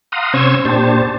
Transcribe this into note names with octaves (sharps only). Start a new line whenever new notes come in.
F5 F#5 A#5 C6 D#6
C3 C#4 C5 C#6 E6 G#6
A#2 D4 G4 C5 A5